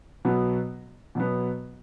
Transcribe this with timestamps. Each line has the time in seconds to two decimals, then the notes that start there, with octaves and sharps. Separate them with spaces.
0.25 B2 F#3 B3
1.15 B2 F#3 B3